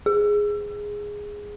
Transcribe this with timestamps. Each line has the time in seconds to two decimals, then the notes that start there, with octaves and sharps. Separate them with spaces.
0.06 G#4